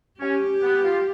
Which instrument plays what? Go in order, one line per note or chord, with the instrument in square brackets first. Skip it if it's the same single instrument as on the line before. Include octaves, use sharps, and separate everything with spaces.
[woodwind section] C#4 [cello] G4
[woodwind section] B3
F4